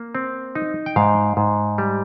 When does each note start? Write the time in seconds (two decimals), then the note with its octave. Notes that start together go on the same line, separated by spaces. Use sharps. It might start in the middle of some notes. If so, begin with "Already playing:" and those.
Already playing: A#3
0.15 C4
0.55 D#4
0.86 G5
0.96 G#2 F5
1.37 G#2
1.78 G3